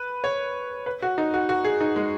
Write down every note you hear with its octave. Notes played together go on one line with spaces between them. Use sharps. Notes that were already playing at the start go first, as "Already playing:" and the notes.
Already playing: B4
C#5
B4
F#4
D#4
F#4
F#4
G#4
D#4
G#3